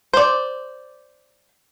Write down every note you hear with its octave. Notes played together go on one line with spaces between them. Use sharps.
C5 D5